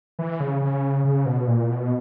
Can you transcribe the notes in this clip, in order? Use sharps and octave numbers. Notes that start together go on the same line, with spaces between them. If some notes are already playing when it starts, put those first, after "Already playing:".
E3
C#3
C#3
C#3
B2
A#2
B2